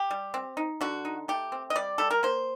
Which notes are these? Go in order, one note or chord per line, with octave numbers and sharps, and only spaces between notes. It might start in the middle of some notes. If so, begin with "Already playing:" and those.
Already playing: G4
G3
C4
D#4
D3 F#4
D#4
A3 G4
C4
D#5
G3 D5
G3 A4
A#4
A#3 C5